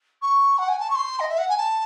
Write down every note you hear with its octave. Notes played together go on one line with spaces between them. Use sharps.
C#6
F#5
G#5
A5
C#6
C6
D#5
E5
F#5
G#5
A5